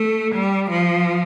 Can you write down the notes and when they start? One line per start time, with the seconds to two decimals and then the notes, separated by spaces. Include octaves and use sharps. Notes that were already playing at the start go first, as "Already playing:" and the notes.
Already playing: A3
0.35 G3
0.70 F3